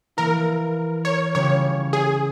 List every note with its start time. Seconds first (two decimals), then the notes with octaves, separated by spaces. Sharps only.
0.17 E3 A#3 E4 A#4
1.05 C#5
1.34 C#3 G3 C#4 F4 C#5
1.93 G#4